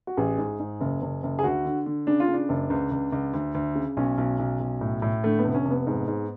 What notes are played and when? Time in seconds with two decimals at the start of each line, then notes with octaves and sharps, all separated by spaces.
0.07 F#4
0.17 A1 G#4
0.38 G#2
0.59 G#2
0.81 F#1
1.02 F#1
1.23 F#1
1.39 G#4
1.43 D2 F#4
1.65 D3
1.86 D3
2.07 C#3 D4
2.20 F4
2.28 C#3
2.34 D4
2.49 F#1
2.70 C#2
2.91 C#2
3.12 C#2
3.34 D2
3.55 D2
3.75 C#3
3.97 B1 C#4
4.18 B1
4.39 B1
4.60 B1
4.81 A2
5.02 A2
5.24 D3 A3
5.39 B3
5.44 F1
5.55 C#4
5.65 F1
5.71 B3
5.87 G#2
6.08 G#2